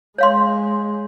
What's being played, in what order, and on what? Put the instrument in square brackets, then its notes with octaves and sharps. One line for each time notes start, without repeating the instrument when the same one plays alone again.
[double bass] G#3 [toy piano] C#5 F5 C6